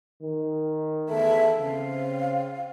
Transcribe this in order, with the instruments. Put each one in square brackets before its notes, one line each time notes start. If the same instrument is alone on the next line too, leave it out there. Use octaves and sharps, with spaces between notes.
[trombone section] D#3
[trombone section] E2 A3 A4 [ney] E5
[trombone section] C#3 C4 [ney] F5